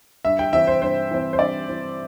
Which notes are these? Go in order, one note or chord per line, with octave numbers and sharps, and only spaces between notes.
G2 E5
G5
E3 C4 E5
C5
G2 C5
E3 C4
C5
G2 D5
E3 C4